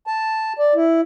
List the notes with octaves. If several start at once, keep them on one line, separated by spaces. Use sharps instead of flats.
A5
D5
E4